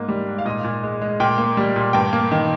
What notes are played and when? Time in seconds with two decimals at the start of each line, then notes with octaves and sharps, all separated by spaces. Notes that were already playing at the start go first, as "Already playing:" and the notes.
Already playing: G#2 A#3
0.08 G3
0.27 G#2
0.38 F5
0.45 A#2 D#5
0.64 A#2
0.83 G#3
1.02 G#3
1.20 A#2 G5
1.38 A#3
1.57 G3
1.76 A#2
1.93 G2 G5
2.13 A#3
2.31 D#3